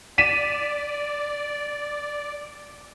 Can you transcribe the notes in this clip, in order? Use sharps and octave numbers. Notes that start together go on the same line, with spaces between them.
D5 B6 D#7 E7